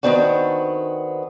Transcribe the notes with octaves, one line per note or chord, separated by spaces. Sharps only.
D#3 F#3 B3 C4 D4 F#4